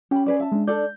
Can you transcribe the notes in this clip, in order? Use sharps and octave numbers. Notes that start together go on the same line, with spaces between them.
C#4 G4 B5
G#4 B4 D5
E5 A5
G#3 D4
D4 A4 D5 G6